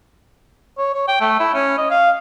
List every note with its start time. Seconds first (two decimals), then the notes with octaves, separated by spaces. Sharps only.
0.78 C#5
0.94 C#5
1.08 G5
1.21 A3
1.40 E4
1.55 C#4
1.78 D#5
1.91 F5